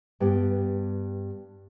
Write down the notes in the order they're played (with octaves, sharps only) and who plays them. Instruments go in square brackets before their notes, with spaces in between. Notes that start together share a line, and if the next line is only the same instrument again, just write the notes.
[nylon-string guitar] G2 B3 G4